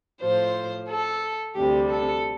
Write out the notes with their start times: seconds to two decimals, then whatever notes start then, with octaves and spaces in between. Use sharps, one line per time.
0.20 A2 F3 C5
0.88 A4
1.55 D2 C3 G3 G4
1.89 A4